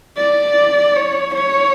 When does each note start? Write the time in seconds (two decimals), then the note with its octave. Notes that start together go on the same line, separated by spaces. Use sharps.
0.17 D5
0.96 C#5
1.35 C#5